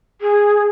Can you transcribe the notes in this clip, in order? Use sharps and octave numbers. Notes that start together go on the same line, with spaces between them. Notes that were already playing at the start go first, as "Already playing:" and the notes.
G#4